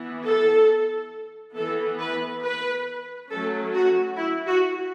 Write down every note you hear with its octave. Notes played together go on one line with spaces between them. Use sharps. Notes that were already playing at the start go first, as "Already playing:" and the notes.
Already playing: E3 B3
A4
E3 B3 A4
B4
B4
F#3 A3 C#4 A4
F#4
E4
F#4